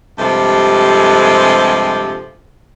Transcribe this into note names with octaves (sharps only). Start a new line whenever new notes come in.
G2 C3 F3 G#3 G4 A4